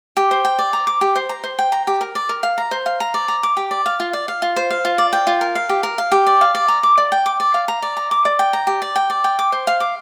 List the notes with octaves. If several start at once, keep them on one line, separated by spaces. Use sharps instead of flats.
G4
C5
G5
D5
A#5
D6
G4
C5
A#5
C5
G5
A#5
G4
A#4
D5
A#4
F5
A#5
C5
F5
A#5
D5
A#5
D6
G4
D5
F5
F4
D5
F5
F4
C5
F5
F4
D5
G5
F4
A#4
F5
G4
A#4
F5
G4
D5
F5
D5
A#5
D6
D5
G5
D6
D5
F5
A#5
D5
A#5
D6
D5
G5
A#5
G4
D5
G5
D5
G5
D6
C5
F5
D6